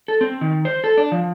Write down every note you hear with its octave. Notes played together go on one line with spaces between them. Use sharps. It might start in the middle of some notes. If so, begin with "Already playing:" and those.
A4
C4
D#3
C5
A4
D4
F3